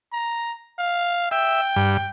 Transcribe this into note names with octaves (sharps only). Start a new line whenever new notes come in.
A#5
F5
E5 G5
G2